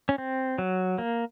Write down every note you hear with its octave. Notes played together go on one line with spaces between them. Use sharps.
C#4
C4
F#3
A#3